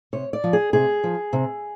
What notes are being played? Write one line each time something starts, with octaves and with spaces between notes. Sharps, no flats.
C3 C#5
D5
F3
G#4
C3 G#4
F3
C3